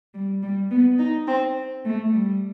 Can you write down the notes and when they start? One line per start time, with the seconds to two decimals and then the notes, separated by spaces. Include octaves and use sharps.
0.14 G3
0.42 G3
0.71 B3
0.99 D#4
1.27 C4
1.85 A3
2.13 G3